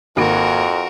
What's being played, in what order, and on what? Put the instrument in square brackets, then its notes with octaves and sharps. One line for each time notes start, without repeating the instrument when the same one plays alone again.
[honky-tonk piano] G#1 A#3 D7 [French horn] F2 [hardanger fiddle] F#4 A#4